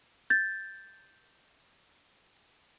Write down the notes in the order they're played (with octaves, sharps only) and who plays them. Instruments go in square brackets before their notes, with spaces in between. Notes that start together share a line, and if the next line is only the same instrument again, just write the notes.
[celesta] G6 A6